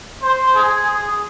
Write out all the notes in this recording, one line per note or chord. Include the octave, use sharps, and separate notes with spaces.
C5
G#4